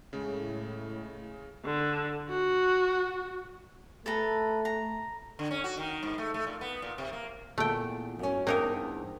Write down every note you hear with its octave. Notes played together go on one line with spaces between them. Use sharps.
A2 C#3 G#3
D3
F#4
A3 A4 B4 A#5
A#5
D3
C#4
F#4
D#3
G#2
A3
A3
A#2
B3
A#2
C3
A#3
E2 A#2 A3 G5
F#2 C#4
E2 G2 A#3 C4 D#4 A#4